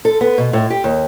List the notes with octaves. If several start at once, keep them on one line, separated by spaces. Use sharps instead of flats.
A4
B3
B2
A2
G4
D#2